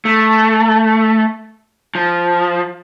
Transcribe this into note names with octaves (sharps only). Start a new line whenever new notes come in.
A3
F3